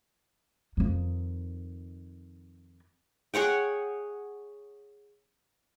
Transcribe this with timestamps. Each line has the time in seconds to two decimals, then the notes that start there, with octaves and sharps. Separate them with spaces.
0.77 F2 D#3
3.34 G#4 C#5 F#5 G5